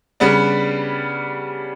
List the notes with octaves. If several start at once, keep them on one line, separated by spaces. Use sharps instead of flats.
C#3 G3 B3 D4